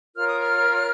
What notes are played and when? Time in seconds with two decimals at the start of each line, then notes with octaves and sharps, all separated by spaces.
0.15 F4 A#4 C#5 F6
0.28 D#6
0.40 F6